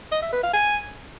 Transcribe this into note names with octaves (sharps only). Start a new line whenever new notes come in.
D#5
E5
B4
F5
G#5